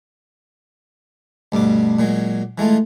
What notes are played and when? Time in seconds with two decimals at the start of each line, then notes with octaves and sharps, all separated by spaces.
1.52 D2 G2 B2 D6
1.99 A#2 F#3 G#3
2.58 E3 G#3 A3 F4